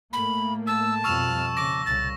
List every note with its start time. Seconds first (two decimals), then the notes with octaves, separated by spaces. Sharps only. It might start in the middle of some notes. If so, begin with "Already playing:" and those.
0.13 A2 A3 A#3 B5
0.67 A5 E6
1.04 F2 B2 G3 C#6 E6 F6 E7
1.57 A#2 C#3 D6 A#6
1.86 C2 C#3 A6